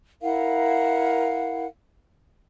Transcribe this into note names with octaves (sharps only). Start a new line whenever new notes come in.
E4 A#4 F5 F#5